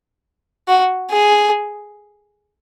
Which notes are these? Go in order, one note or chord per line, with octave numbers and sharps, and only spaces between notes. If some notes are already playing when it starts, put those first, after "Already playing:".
F#4
G#4